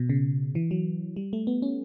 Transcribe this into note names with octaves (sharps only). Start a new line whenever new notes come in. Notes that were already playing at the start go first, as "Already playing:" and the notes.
Already playing: B2
C#3
E3
F#3
G3
A3
B3
C#4